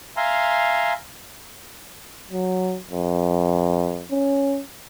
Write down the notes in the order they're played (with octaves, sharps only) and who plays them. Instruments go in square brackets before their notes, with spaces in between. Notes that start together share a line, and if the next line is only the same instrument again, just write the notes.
[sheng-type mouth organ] E5 F5 G#5 A#5 C6
[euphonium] F#3
F2
C#4